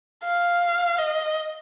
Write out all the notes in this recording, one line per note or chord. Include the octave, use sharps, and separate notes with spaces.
F5
D#5